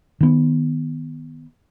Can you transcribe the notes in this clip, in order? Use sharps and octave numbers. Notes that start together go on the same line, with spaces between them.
D#3 B3